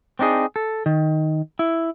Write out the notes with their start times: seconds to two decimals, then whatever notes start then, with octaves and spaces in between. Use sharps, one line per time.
0.19 C4 D4 D#4 G#4
0.56 A4
0.86 D#3
1.59 E4